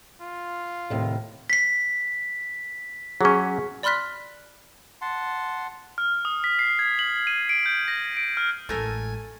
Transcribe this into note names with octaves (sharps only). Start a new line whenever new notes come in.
F4
D#2 A2 C3
B6 C7
F#3 C#4 G#4 C#6
D5 B5 C6 F6 F#6 B6
F#5 A5 C6
F6
D#6
B6
C7
G#6
F#7
D#7
D7
G6
A#6
D7
F6
A1 G#3 A3 A4 A#4 G#5